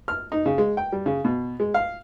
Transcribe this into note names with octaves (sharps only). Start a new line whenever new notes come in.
F6
D#4
C#3
G#3
G5
G3
C#3
B2
G#3
F5